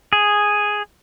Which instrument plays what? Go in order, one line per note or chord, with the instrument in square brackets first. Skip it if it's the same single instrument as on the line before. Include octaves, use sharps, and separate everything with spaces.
[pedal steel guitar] G#4